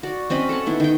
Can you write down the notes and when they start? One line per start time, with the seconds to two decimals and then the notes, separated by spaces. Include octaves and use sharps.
0.03 F#4 D5
0.30 C4 C#4 D#5 B5
0.49 A4 C#5 F#5 A5
0.66 D#3 B3 E4
0.80 D#3 G5